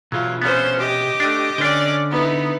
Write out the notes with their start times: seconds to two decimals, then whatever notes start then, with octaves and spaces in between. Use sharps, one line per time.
0.12 B2 F#3 F4 G#4
0.42 C3 B3 C#4 C5
0.79 G4 D#5 D6
1.20 A3 D4
1.58 D3 C#4 D4 D5 G5
2.11 B3 D#4 E4